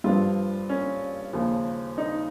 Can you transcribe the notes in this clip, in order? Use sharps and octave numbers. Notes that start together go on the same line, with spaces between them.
G2 F3 F4
C#4
D#2 C#3 F3
D#4